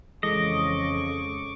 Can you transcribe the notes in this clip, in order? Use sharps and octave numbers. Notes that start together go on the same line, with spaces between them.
F2 C#3 E3 G#3 A4 D#5 C#6 D6